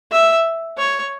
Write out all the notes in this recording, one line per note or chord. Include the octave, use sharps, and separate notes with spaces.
E5
C#5